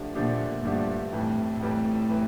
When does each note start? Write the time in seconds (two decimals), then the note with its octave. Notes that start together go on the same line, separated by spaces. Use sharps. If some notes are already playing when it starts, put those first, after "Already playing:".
Already playing: D3 F3 A3 D4 G4
0.15 A#2 D3 F3 A3 D4 G4
0.64 G2 D3 F3 A3 D4 G4
1.13 F2 A2 E3 G3
1.61 F2 A2 E3 G3
2.09 E3 G3